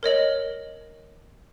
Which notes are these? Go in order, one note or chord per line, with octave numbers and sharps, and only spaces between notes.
A#4 C#5 D#5 F#7